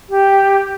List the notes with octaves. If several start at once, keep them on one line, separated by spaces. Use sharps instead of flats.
G4